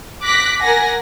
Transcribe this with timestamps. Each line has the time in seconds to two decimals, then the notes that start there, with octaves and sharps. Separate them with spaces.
0.24 D6 F#6 A#6 B6
0.60 A#4 F#5 G#5 A#6